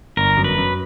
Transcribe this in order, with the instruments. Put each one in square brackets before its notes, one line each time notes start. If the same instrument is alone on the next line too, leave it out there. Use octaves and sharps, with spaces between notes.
[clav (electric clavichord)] G1 [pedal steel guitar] A#4
[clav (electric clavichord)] F#2
[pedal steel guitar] B4
[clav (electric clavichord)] F#2